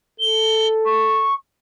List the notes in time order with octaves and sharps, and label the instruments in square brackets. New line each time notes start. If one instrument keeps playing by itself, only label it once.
[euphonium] A4 [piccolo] G7
[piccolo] C#6